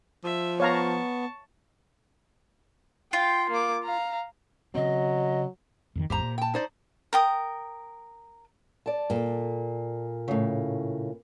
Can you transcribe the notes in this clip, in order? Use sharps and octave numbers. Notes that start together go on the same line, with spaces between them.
F3 E5
B3 C#5 F5 A5 A#5 C#6
F4 G5
A#3 D6
F5 A#5
C#3 F#3 C4 D#5
F2 D3 D#3
G#1 E2 G#2 G4 C5 A#5
A#2
G5 A5
D#4 C5 D5
A#4 G5 D#6
D5 A5
A#2 A4
A2 C#3